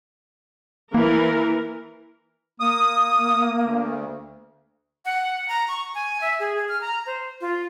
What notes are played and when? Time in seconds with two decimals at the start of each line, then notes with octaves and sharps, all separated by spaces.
0.95 E3 A#3 A#4
2.60 A#3 D#6
3.61 D2
5.05 F#5
5.49 A#5
5.68 C#6
5.95 G#5
6.21 E5
6.40 G#4
6.56 G#4
6.69 F6
6.81 A#5
7.06 C5
7.41 F4